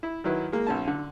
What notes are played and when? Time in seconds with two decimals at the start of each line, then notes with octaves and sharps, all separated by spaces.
0.03 E4
0.24 D#3 F#3 E4 B4
0.52 G#3 A#3
0.67 B1 C#4 A5
0.87 D3